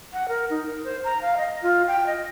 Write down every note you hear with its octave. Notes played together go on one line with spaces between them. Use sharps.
F#5
A#4
D#4
A#4
C5
A#5
F5
D#5
F4
G5
D#5